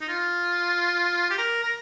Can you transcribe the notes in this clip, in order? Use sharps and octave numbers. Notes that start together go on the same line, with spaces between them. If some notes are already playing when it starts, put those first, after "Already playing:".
D#4
F4
G4
A#4
A#4